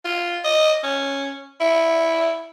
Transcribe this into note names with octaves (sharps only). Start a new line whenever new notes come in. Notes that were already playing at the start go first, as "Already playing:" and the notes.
F4
D#5
C#4
E4